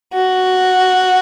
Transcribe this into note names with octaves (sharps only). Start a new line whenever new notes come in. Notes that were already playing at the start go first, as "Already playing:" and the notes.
F#4